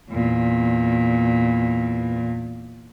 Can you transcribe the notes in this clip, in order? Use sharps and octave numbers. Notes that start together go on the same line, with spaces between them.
E2 A#2